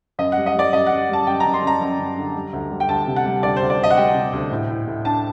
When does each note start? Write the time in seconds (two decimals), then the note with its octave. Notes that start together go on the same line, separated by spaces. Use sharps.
0.19 F#2 D#5
0.32 G3 F#5
0.46 D#5
0.55 G3 D5
0.73 F#2 D#5
0.87 F#2 F#5
1.09 G3 A5
1.27 F#2 G5
1.40 F#2 A#5
1.54 C6
1.63 F#2 A#5
1.81 F#2
1.99 F#2
2.17 D3
2.35 G3
2.53 D2
2.71 G3
2.80 G5
2.89 D2 A5
3.07 C3
3.16 F#5
3.25 G3
3.43 D2 D5
3.56 D2 C5
3.70 D5
3.79 D2 D#5
3.90 F#5
3.97 G3 G5
4.15 C3
4.33 D2
4.51 A2
4.69 A2
4.87 A2
5.05 D4 A5